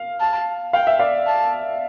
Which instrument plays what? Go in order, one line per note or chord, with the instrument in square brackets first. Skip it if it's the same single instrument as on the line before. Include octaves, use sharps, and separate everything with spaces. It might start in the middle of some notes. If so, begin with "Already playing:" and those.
Already playing: [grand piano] F5
[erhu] A5
[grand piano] F5 [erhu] G5
[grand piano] E5
D5 F5
[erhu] A5